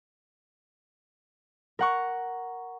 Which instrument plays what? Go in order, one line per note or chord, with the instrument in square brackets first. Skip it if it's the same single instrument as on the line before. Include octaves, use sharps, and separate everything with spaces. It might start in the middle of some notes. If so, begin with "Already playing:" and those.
[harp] A#4 F#5 C#6